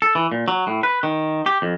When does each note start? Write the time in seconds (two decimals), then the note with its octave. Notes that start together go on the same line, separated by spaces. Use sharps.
0.02 A4
0.15 E3
0.32 A#2
0.48 F#3
0.67 A2
0.83 B4
1.03 D#3
1.46 G4
1.62 F2